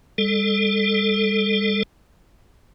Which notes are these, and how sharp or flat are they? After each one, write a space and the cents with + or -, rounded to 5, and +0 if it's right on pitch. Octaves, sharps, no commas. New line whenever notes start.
G3 +40 A4 +0